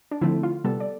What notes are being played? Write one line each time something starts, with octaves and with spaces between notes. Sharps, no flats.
D4
D3 F3 A3 C4 E4
F4
C3 G3 B3 A4
D5